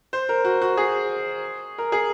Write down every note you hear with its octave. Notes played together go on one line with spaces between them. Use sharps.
C5
A#4
F#4
F#4
G#4
A#4
G#4